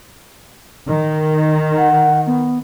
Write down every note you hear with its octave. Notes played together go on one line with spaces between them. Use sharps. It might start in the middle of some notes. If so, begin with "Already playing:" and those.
D#3
F#5
B3